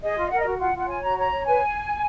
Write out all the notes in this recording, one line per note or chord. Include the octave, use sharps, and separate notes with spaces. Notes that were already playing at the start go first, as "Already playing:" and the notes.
G#4 D#5
F4
A#4 F#5
D#5
F#4
F4 F#5
F4 F#5
C#5 G#5
F#4 A#5
C#5 A#5
C#5
B4 G#5